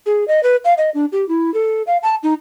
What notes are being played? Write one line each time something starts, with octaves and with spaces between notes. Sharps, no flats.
G#4
D#5
B4
F5
D#5
D4
G4
E4
A4
F5
A5
D#4